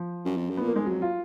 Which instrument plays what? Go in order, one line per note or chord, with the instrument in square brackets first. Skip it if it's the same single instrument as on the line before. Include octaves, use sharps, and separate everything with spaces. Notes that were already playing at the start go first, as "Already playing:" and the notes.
Already playing: [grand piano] F3
[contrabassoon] F#2
F2
F#2
[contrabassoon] A#2 [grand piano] B3
[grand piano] A#3
[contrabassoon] G#2 [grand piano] G#3
[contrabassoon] F2 [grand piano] F#3
[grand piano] F4